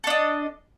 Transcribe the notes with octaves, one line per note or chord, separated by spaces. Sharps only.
D4 A4 D#5